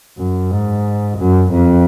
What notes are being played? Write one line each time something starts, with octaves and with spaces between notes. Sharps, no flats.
F#2
G#2
F#2
F2